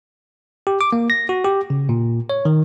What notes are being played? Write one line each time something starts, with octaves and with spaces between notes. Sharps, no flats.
G4
D6
A#3
A#6
F#4
G4
C#3
A#2
C#5
D#3